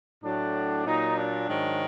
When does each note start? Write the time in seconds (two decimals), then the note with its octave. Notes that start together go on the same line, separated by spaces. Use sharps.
0.23 A2 F#3 D4
0.85 A#2 F#3 D#4
1.16 D4
1.47 G#2 D#3 F#3